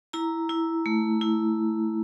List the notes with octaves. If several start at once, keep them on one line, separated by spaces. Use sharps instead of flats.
E4 A#5
E4
A3
E4